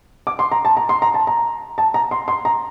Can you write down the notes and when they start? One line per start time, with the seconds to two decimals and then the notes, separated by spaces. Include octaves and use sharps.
0.27 D6
0.39 C6
0.52 A#5
0.65 A5
0.77 A#5
0.89 C6
1.02 A#5
1.14 A5
1.27 A#5
1.78 A5
1.94 A#5
2.11 C6
2.28 C6
2.45 A#5